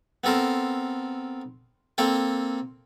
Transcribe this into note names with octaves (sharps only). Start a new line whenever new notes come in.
B3 C4 A4 A#4 C5
A#3 C4 A4 G5